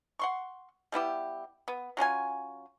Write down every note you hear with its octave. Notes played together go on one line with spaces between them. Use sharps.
F#5 C6 C#6
G3 B3 E4 G4
B3
F#3 C#4 F4 G#5